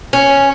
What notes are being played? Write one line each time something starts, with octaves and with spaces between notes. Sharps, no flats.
C#4